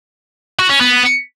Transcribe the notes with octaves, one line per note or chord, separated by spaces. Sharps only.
F#4
C#4
B3